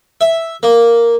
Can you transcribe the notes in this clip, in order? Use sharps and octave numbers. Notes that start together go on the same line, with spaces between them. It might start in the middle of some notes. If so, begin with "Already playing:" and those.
E5
A#3